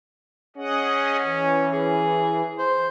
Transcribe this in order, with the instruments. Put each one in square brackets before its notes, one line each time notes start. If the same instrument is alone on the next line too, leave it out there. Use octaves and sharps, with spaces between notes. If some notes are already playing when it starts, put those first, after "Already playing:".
[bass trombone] C#4 [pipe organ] G#4 D#5 F#5
[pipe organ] E3
[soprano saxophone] G#4
C5